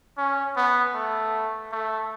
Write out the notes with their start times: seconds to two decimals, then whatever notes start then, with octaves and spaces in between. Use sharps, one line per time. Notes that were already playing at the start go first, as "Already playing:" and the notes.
0.18 C#4
0.56 B3
0.94 A3
1.72 A3